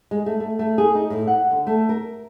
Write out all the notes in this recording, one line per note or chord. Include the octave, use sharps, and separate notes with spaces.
G#3
A3
A3
A3
G#4
D#4
A2
F#5
D3
A3
A#4